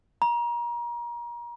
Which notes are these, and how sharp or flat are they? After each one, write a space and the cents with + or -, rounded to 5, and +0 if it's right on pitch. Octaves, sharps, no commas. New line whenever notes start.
A#5 +30